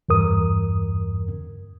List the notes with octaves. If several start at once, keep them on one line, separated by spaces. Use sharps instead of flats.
E2 G2 A#4 D#6